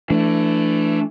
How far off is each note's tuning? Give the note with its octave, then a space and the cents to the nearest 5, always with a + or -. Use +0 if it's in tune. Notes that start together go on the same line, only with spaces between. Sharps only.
E3 +25 A3 +0 D4 +0